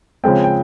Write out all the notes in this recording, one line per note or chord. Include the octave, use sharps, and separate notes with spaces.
C#3 F3 G#3 C4 G5
G5